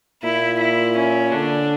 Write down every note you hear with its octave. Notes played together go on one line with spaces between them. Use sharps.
A#2 E4
E4
C#4
D3 D4